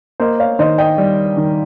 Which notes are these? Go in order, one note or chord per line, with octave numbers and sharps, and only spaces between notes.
A#3 C5 D#5
C#5 F5
D#3 C5 D#5
D#5 G5
G3
D#3